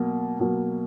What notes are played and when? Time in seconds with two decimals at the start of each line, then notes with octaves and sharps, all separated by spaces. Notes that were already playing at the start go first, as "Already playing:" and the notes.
Already playing: B2 F#3 A#3
0.39 B2 F#3 A#3